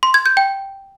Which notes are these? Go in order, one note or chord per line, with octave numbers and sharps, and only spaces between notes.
C6
G#6
G6
G5